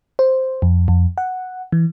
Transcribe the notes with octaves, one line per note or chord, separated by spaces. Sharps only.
C5
F2
F2
F#5
E3